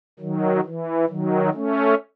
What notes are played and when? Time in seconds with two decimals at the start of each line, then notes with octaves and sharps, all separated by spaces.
0.19 D#3 F#3
0.65 E3
1.09 D#3 F#3
1.54 A3 C#4